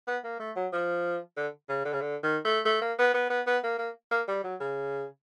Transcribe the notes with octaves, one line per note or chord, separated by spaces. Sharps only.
B3
A#3
A3
F#3
F3
D3
C#3
D3
C#3
D3
D#3
A3
A3
A#3
B3
B3
B3
B3
A#3
A#3
A#3
G3
F#3
C#3